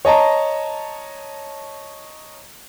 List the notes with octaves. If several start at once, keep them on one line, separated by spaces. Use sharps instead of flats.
C#5 D#5 A5 A#5